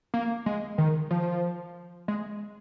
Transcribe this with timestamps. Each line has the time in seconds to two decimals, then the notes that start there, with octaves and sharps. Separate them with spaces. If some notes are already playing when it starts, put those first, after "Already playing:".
0.14 A#3
0.46 G#3
0.78 D#3
1.11 F3
2.08 G#3